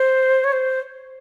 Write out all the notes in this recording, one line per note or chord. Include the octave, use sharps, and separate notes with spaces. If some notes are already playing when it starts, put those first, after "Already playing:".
Already playing: C5
C#5
C5